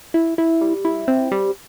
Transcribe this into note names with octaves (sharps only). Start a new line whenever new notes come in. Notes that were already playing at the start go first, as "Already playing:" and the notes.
E4
E4
G3
E4
C4
G3